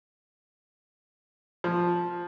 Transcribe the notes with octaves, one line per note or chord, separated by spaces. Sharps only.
F3